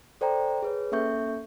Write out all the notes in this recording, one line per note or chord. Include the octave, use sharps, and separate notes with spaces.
A4 C5 D5 G5 A#5
G#4 B4 C#5
A#3 C#4 A4 E5 C#6 G6